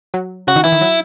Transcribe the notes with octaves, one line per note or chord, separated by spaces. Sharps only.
F#3
C#3 F#4
D#3
E3 E4
D#3
F#3